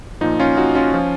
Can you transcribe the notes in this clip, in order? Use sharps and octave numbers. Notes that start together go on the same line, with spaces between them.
A#2 F3 D#4
C#4 F4
D#4 F#4
C#4 F4
F3